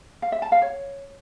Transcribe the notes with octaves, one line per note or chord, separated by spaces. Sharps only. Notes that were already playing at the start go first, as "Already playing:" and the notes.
F5
E5
A5
F5
C#5